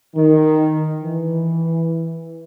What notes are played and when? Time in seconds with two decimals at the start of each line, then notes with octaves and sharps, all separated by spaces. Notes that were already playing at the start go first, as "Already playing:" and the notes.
0.15 D#3
1.03 E3